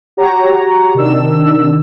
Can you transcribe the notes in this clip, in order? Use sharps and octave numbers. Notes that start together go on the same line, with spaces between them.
F#4 G4 C#5 A#5
C3 D#3 D4 E6